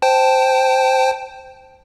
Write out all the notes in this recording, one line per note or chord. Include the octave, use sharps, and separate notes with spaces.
C5 G5 A5